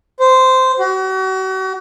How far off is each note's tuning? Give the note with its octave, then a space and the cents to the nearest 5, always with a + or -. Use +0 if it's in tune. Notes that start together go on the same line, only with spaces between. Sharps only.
C5 -10
F#4 +40